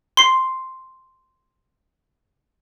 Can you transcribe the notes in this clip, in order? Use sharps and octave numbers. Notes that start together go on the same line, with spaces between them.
C6 C7